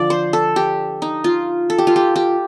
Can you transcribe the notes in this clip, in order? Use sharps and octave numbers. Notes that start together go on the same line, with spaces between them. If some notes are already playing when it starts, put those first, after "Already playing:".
Already playing: D3 F3 D5
C5
A4
G4
D#4
F4
A4
G4
F4
G4
G4